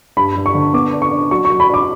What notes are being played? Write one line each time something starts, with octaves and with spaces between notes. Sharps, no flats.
G2 B5
G2
C#6
D3
B3 D6
D4
C#6
D4
F#3 C#6
C#6
F#3
B5
D4 D6